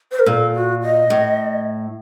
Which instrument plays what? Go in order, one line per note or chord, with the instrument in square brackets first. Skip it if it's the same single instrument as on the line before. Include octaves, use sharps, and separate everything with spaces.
[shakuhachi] C5
A#4
[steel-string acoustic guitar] A#2 [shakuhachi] A4
[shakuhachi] F#4
D#5
[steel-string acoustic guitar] A2